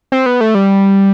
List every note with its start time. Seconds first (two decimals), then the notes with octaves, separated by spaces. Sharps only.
0.12 C4
0.26 B3
0.41 A3
0.55 G3